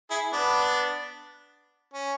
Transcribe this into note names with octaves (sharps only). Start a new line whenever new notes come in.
E4 G#4
B3 D4
C#4